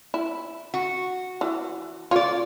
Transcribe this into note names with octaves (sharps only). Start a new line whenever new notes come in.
E4
F#4
E3
F4 C#5 D5